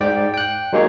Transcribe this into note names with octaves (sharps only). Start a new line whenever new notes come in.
G#2 D5 G5
G5 F#6
F#3 G#3 A#3 D#4 G#4 C#5